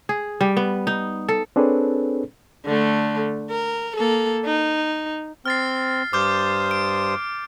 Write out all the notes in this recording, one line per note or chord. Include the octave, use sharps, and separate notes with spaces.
G#4
G3
B3
D#4
A4
C4 D4 G#4 A4 B4 C#5
D3 A3
A#4
A#3 A4
D#4
C4 F6 A6 C7
G2 C5 D6 D#6 F6 G6
D7